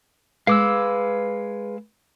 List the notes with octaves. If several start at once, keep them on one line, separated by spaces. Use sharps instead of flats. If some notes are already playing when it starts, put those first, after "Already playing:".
G#3 B4 F5 D6 E6